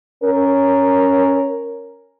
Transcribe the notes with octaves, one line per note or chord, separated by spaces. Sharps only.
C#4 A#4